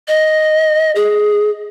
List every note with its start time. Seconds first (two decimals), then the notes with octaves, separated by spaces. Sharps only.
0.08 D#5
0.96 G#4